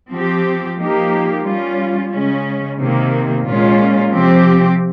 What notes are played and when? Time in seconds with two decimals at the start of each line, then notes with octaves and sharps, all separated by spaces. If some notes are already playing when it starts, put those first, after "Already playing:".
0.11 F3 C4 G4
0.77 F3 A#3 D#4 G4
1.44 G3 C#4 F4
2.11 C#3 G#3 C#4
2.78 C3 D#3 A#3
3.45 A#2 G#3 C#4 F4
4.12 C3 F3 C4 G4